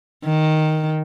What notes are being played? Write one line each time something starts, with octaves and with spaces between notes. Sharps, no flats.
D#3